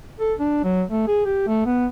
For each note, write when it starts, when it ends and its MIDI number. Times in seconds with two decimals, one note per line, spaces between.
0.20 0.34 69
0.39 0.61 62
0.64 0.82 54
0.90 1.07 57
1.08 1.22 68
1.25 1.46 67
1.47 1.63 57
1.66 1.86 59